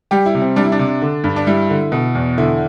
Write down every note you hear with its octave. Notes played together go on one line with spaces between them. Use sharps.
G3 G4
E4
C3
C4
G3 D4
E4
D4
C3
D3
G2
D4
G3 E4
D3
B2
E2
D3 E4